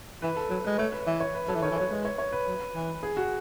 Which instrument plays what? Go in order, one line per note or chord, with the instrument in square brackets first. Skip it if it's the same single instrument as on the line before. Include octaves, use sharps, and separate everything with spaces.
[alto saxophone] E3 [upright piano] B4
[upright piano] A4
[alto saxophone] F#3 [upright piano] B4
[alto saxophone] G#3 [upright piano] B4
[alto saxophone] A3 [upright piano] C#5
[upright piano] B4
[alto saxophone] E3
[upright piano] C#5
B4
[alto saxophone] F#3 [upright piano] A4
[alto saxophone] E3
[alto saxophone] D#3 [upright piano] C#5
[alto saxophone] E3
[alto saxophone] F#3 [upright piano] C#5
[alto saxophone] G#3 [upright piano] B4
[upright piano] C#5
C#5
B4
[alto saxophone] F#3
E3
[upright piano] G#4
F#4